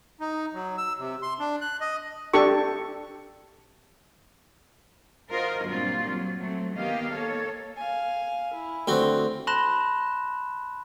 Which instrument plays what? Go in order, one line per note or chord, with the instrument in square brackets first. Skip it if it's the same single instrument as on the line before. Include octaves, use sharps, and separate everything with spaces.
[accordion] D#4
F#3
E6
C3
C6
D4
F#6
D#5
[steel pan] D4 G4 A4 C#6
[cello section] F4 F#4 A#4 C5 D#5
G2 A#2 F#3 C4 F4
F#3
F#3 A3 C4
D#3 A#3 B3 G4 D#5 F5
A#3 A4 C#5
[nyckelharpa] F5 G#5
E4
[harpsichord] D2 C4 F#4
[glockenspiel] A5 B5 C6 F#6 A#6 E7